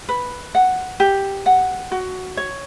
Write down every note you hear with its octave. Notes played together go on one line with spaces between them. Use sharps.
B4
F#5
G4
F#5
F#4
C#5